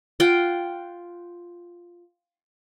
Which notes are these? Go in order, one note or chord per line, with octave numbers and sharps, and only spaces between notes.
F4 F#5 G5